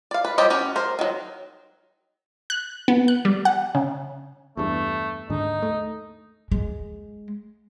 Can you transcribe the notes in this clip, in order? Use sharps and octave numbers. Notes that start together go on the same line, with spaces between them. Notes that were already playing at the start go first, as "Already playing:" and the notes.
D5 F5
B4
F3 G3 G4 C#5 D#5
C#4 F#4 G4
A#4 C5
D#3 F#3
F#6
B3
F#6
G3
F#5
C#3
E2 G2 A3
D#2 G#2 D3 D#4
A3
G#3